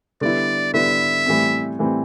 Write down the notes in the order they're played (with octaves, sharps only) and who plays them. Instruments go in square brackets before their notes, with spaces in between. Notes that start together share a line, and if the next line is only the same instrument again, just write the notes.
[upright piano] D3 G3 B3 E4 [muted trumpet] D5
[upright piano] D3 G3 B3 E4 [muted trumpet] E5
[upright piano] A2 E3 G3 C4
A2 E3 G3 C4